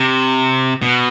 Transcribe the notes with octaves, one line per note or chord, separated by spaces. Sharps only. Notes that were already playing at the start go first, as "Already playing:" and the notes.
Already playing: C3
B2